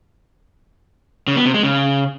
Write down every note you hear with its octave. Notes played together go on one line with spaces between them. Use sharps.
C#3
B3
C3
G#3
C#3